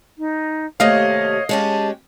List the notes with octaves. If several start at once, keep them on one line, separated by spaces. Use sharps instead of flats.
D#4
D#2 C3 A3 C#5 D#5 F5
G#3 C#4 G4 A5